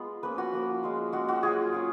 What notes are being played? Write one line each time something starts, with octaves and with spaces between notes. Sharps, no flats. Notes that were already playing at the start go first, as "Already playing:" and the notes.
Already playing: G#3 B3 F4
F3 A#3 C#4 B4
F#4
F3 A#3 C#4
G#3 C#4 F4
G#3 C#4 F4 F#4
F#4
F#3 C#4 F4 G#4
F#3 C#4 F4